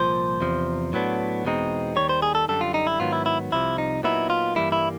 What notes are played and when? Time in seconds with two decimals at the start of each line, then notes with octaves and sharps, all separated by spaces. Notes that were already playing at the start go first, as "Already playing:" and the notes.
Already playing: C2 A#2 F3 C5
0.41 E2 C3 F3
0.93 A2 F#3 B3 D4
1.44 E2 B2 G#3 C4 D#4
1.96 D#2 D#3 G3 C#5
2.09 C5
2.22 G#4
2.35 A4
2.48 F#2 D3 G3 A4
2.61 F4
2.74 D#4
2.87 E4
3.00 G#2 D#3 F#3 B3 F4
3.13 E4
3.26 E4
3.52 C2 C3 F3 E4
3.78 D#4
4.03 A#2 F#3 B3 D#4 E4
4.30 F4
4.55 G2 E3 G3 A#3 E4
4.72 E4